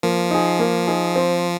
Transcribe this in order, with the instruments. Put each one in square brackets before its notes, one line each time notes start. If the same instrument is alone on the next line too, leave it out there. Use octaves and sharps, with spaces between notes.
[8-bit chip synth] F3 [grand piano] A#3
[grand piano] D#4 G#4
A#3
D#4 G#4
C4